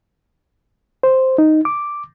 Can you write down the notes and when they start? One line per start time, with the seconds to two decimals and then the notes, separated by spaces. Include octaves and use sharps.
1.03 C5
1.38 D#4
1.65 D6